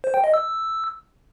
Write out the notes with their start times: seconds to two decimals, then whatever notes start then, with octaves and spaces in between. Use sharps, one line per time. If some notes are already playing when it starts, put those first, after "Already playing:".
0.04 C5
0.14 G5
0.24 D#5
0.34 E6